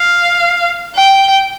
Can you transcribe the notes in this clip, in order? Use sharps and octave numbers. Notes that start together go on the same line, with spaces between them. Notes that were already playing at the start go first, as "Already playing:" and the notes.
Already playing: F5
G5